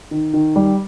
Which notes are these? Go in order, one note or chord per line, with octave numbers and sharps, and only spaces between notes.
D#3
D#3
G3